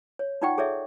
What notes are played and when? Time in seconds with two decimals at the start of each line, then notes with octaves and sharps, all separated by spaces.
0.19 C#5
0.41 D#4 F4 D5 F#5 G5 C#6
0.58 G#4 A4 C#5 D5 E5